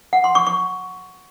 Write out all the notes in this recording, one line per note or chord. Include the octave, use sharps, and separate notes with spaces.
F#5
C6
C#6
C#6